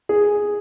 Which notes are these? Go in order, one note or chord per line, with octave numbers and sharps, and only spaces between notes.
G#4